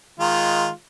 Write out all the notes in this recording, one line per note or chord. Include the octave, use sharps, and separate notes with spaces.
D#3 G#3 F4